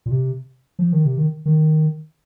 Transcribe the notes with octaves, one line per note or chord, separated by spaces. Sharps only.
A#2
C3
F3
D#3
C3
D#3
D#3